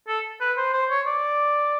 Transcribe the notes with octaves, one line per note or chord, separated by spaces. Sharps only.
A4
B4
C5
C5
C#5
D5